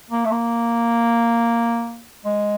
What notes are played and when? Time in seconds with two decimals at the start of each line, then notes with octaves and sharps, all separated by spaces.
0.10 A#3
0.25 A3
0.31 A#3
2.25 G#3